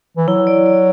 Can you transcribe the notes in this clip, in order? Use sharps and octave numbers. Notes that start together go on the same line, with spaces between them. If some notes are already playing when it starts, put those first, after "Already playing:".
E3
F#3 E4
D5
D5